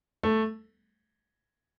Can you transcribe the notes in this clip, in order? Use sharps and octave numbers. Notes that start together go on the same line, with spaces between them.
A3